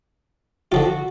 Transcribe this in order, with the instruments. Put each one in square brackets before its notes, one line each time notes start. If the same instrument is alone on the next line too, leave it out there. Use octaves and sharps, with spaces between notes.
[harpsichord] D3 F3 F4 [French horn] F#4